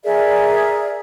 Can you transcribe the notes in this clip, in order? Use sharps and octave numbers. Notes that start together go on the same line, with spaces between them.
G#4 A#4 D5 E5